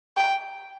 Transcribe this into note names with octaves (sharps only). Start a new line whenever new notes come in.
G5